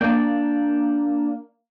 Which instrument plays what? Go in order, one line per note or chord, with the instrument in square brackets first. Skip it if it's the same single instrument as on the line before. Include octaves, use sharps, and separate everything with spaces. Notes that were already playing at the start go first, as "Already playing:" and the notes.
[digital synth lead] A#3 [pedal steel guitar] D4 D5 G5